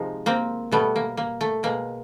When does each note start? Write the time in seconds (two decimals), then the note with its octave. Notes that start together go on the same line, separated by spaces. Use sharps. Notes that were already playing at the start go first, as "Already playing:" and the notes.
Already playing: C3 F3 G#3 D#4
0.26 A#3 C4
0.71 B2 G3 A3 B3
0.96 A#3
1.17 A#3
1.41 A3
1.63 B2 G#3 A#3